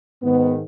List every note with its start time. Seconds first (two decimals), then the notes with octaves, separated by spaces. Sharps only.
0.22 G#2 D#3 B3